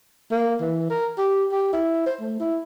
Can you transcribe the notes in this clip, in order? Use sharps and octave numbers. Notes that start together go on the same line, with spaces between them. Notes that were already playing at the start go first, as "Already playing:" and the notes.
A#3
E3
A#4
G4
G4
E4
C5
A3
E4